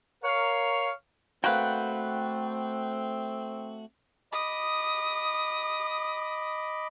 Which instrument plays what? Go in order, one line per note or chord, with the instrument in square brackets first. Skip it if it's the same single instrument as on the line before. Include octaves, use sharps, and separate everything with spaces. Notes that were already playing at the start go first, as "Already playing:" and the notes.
[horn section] A#4 C#5 F5
[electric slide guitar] A3 F#4 [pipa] A#3 B4 [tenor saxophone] C4 [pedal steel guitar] F#5 G5
[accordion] D#5 B5 D6 [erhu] D#6